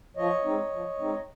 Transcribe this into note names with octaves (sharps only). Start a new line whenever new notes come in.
F3 C#5 D#5
G#3 C4 D#4
F3
G#3 C4 D#4